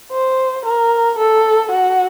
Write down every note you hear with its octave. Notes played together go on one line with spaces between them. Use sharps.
C5
A#4
A4
F#4